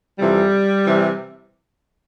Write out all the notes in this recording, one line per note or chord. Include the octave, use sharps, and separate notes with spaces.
F2 C3 E3 G3
C3 E3